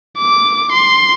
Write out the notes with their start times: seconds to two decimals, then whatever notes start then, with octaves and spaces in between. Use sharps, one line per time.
0.19 D6
0.73 C6